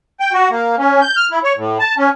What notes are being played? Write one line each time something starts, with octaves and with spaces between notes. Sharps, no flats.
G5
F#4
A#3
C#4
G6
F6
E4
C#5
A2
A5
C#4